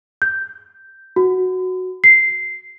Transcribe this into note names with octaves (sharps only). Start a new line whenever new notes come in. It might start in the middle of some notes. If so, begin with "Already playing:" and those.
G6
F#4
C7